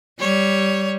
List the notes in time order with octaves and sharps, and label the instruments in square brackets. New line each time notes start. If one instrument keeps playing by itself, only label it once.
[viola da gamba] G3 [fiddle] C#5